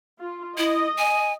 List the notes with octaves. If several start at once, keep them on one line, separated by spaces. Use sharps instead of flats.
F4
E4 D#5
G#5